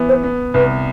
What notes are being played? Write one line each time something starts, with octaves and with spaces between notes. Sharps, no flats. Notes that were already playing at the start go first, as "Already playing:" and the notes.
Already playing: E3 B3
C5
B3
C2 B4